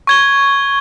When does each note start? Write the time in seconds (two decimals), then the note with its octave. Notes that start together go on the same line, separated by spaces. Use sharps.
0.07 C#6 G#6 G7